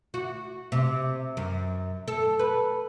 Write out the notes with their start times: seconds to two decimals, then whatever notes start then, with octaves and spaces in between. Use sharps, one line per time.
0.14 F#4
0.72 C3
1.37 F#2
2.08 A4
2.39 B4